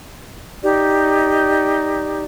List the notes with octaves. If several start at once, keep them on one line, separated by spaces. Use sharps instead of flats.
D#4 G4 D5